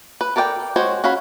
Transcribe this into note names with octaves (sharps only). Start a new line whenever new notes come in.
B4
A4 A#4 D5 F5 G5
G#3 F#4 C5 C#5
C#4 F#4 F5 B5